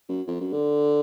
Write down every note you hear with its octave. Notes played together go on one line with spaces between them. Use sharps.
F#2
F2
F#2
D3